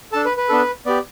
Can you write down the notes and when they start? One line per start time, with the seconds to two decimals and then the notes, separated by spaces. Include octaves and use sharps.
0.12 D4 A4 A5
0.25 B4
0.37 B4
0.49 B3 D4 A4
0.86 B3 G4 D5